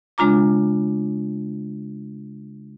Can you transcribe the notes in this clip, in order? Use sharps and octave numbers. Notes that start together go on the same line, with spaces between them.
C#3 G#3 D4 F4 A#5 D6